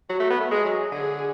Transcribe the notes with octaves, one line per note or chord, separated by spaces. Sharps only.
F#3 F#4
A3
B3
A3
G#3 G#4
F#3
D3 G#4